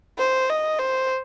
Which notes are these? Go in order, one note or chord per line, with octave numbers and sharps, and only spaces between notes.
C5
D#5
C5